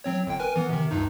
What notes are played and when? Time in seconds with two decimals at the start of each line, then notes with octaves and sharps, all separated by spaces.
0.04 F#3 C4 C#5
0.27 G1 G5
0.40 A#4 B4 G#5
0.56 E3 B3
0.69 C3 D#3
0.91 C#2 G2 D#4